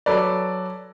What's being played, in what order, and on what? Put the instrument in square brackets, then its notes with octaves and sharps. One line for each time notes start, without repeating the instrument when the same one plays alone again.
[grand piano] F#3 A4 B4 D5